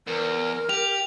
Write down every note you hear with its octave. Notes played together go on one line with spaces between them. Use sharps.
E2 A#4
G4 F7